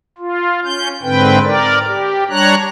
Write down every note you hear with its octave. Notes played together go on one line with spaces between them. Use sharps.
F4
C#4 G6
G#2 D3 C4 B4 G5
A#4 D5
G4
G3 D4 C#5 A#5 F#6